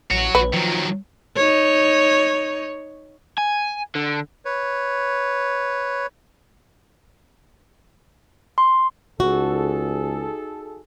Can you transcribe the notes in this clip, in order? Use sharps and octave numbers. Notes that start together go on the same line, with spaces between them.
A1 F#4 C#5
A#1 B4
D#3 F3 F#3
D#4 C#5
G#5
D3
B4 C#5
C6
C#2 D#4 F#4 G#4 A4